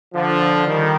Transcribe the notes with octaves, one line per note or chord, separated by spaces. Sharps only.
D3 F3
D#3 G3